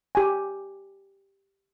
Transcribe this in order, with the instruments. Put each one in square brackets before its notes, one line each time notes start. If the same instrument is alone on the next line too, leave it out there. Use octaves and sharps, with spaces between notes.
[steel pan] G4 G#5